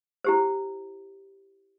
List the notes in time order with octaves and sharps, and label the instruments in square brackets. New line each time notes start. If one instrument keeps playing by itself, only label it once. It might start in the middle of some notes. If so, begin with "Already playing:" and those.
[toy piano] E4 G4 C5